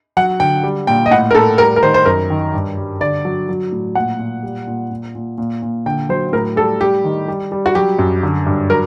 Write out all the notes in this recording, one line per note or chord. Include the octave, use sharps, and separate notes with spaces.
F#3 F#5
D3 G5
G3
A#2 G5
D#5
A2 F#5
A#4
A2 A4
G3 A#4
A#4
D#3 C5
C5
F#2 A#4
D#3
G2
G3
D3 D5
F#3
F#3
A2
A#2 F#5
A#2
G3
A#2
A#2
A#2
A#2
A#2
D3 G5
F#3 C5
A2 A#4
G3 A4
G3 G4
D#3
G3
G3
F#4
F#3 G4
F#2
D3
G2
F#3 A#4